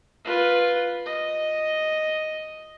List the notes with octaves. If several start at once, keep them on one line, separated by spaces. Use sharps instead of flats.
F4 B4
D#5